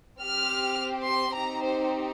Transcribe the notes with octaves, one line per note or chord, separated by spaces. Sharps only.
C4 G4 F6
C6
C4 D#4 G4 A#5
C5